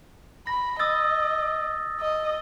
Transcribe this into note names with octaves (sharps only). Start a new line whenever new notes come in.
B5 A#6
D#5 D#6 E6 A6
D#5